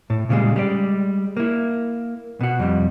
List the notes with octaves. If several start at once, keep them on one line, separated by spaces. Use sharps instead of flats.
A2
A#2 C#3 F3 G3 G#3
G3 G#3 D5
A#3 E4
B2 F#4
F2 G3